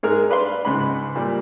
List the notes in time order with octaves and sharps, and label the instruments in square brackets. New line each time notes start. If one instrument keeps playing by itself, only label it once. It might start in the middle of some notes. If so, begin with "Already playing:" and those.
[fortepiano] G#2 G#4 A#4 F6
D4 B4 F5 C6
C#2 G#2 B5
A#2 G3